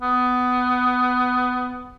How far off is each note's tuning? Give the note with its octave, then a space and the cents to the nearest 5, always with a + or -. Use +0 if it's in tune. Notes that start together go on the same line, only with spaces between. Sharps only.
B3 +15